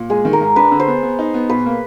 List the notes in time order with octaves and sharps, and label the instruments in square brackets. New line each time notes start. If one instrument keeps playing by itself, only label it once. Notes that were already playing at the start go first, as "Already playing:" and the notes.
Already playing: [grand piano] A#2
[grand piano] G#3 [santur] G#4
[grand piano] D#3
[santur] A#4
[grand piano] G#2
[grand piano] D4 [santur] B4
[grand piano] D3
[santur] C5
[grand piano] B3
B3
D#4
B3
[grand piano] B2 [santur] B4
[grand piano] A#3